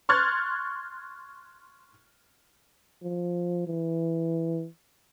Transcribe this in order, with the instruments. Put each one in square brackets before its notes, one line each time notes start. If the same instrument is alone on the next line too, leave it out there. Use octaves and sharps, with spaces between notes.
[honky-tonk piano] C6 C#6 F6 F#6 G#6 A6
[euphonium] F3
E3